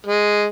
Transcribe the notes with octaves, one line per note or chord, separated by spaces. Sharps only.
G#3